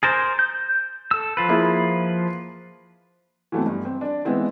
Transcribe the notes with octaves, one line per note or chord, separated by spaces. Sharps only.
G#4 A#4 C5 A6
G6
A4 E6
F3 F4 B4
A#3 E4 G#4
E3 F#3 A3 B3 C4
G2
C4
D4 D5
E3 G#3 B3 C4 E4